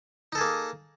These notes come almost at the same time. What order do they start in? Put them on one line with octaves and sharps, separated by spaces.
D#4 A4 G#4 A#3